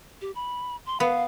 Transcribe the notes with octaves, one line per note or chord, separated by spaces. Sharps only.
G4
B5
C6
B3 F5